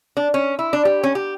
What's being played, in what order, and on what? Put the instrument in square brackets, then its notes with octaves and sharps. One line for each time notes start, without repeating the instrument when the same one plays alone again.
[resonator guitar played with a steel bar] D4
C#4
E4
D4
G4
C#4
G4